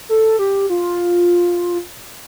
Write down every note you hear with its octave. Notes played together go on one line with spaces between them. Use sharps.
A4
G4
F4